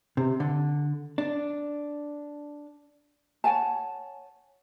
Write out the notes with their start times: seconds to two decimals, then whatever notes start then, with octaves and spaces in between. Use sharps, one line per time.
0.17 C3
0.40 D3
1.18 D4
3.44 C#5 F#5 G#5 A5